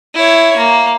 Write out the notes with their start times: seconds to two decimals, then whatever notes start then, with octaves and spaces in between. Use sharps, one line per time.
0.15 E4 C#5
0.57 A#3